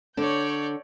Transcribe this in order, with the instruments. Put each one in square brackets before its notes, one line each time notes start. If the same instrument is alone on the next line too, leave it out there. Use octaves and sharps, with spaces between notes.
[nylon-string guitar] D3 D4 [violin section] C#5 D5 G6